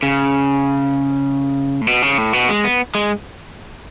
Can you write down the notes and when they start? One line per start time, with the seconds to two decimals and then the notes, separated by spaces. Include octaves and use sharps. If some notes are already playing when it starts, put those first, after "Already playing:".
0.03 C#3
1.81 A2
1.87 B2
2.02 C#3
2.18 A2
2.33 B2
2.49 G#3
2.64 B3
2.95 G#3